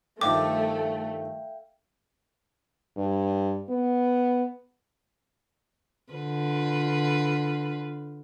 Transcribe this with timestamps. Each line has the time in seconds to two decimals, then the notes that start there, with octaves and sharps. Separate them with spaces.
0.21 G2 D#3 F3 A3 E5 F5 G5 D6
2.97 G2
3.70 B3
6.12 D3 F4 B4